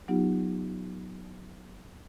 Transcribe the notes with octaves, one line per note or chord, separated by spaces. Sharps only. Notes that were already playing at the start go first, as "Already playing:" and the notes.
F#3 B3 D#4 F4 G4